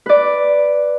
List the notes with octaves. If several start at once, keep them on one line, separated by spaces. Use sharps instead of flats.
B4 D5